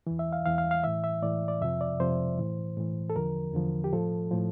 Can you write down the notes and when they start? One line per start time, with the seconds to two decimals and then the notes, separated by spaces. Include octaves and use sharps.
0.07 E2 E3
0.19 E5
0.33 F5
0.45 E2 E3 F5
0.58 F5
0.71 F5
0.84 A2 E3 E5
1.04 E5
1.22 A2 E3 D5
1.48 D5
1.61 F2 C3 F3 E5
1.81 D5
2.00 F2 C3 F3 C5
2.38 A2 E3
2.77 A2 E3
3.10 A4
3.16 E2 D3 F3 A#4
3.54 E2 D3 F3
3.84 G4
3.93 A2 F3 A4
4.31 A2 F3